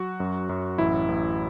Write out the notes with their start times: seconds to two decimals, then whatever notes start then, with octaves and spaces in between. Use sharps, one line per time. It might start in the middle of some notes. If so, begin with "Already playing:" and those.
Already playing: F#3 F#4
0.20 F#2
0.49 F#2
0.78 A1 E4
1.08 A1